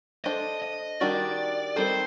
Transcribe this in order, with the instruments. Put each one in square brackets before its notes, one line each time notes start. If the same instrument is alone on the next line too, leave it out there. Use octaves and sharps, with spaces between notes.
[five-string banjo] D4 A4 C5 [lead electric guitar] D#5
[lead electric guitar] D#5
[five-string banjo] D#3 G3 D4 F#4 [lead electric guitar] D5
[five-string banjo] D#3 G3 C4 D#4 A4 [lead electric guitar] C5